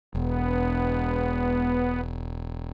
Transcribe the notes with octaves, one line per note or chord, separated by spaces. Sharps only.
E1 B3